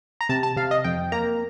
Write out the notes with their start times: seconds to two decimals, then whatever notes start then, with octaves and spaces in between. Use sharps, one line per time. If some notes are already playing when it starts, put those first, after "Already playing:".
0.21 A#5
0.29 C3 A5
0.43 A5
0.57 C3 F5
0.71 D#5
0.84 F2 G5
1.12 A#3 A#5